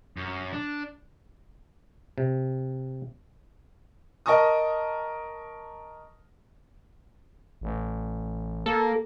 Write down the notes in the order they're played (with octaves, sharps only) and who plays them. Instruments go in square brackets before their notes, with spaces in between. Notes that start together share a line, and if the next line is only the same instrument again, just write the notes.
[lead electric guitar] F#2
D4
[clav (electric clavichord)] C3
[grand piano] A#4 D#5 A5 C#6 D#6
[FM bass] A1
[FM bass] A#3 [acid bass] A4